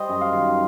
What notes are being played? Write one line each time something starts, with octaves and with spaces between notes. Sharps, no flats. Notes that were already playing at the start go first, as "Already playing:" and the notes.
Already playing: G3 C5 D#5
F#2
F5
D#3